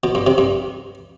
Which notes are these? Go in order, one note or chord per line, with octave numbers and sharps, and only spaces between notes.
B2
G2
C3
G2